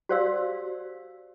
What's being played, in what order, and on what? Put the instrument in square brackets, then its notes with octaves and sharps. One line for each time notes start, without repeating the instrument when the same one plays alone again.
[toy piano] F#4 G4 C5 D5 F5 E6